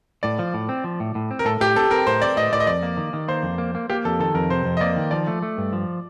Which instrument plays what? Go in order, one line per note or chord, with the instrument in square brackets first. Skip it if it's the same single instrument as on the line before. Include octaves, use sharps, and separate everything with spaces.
[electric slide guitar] A2 [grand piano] D5
[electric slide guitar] F3
A2
C4
F3
A2
A2
C4
[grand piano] A#4
[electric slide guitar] A2 [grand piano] A4
[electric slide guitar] A2 [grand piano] G4
[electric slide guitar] C4 [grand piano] A4
[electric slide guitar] C4 [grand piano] A#4
[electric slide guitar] A2 [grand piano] C5
[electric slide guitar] C4 [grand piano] D5
[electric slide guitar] A2 [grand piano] D#5
[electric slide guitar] A2 [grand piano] D5
[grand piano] D#5
[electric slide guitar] F2 [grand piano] D5
[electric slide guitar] A#3
D#3
D#3
[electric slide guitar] A#3 [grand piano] C5
[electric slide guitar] F2
A#3
A#3
[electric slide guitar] A#3 [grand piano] G4
[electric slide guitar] F2 [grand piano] A4
[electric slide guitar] D#3 [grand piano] A4
[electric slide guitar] F2 [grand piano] A#4
[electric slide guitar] C3 [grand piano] C5
[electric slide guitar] F2
[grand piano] D#5
[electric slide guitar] A#3 [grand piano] D5
[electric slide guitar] D#3
[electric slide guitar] F3 [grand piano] D5
[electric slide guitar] A3
A3
G2
F3